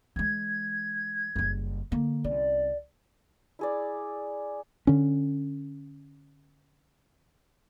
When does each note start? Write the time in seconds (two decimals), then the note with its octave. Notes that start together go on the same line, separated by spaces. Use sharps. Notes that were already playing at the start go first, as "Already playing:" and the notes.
0.16 E3 G#3 G#6
1.36 F#1 G3
1.92 D3 A#3
2.24 C2 C#4 D5
3.59 E4 G#4 D5
4.87 D3 C#4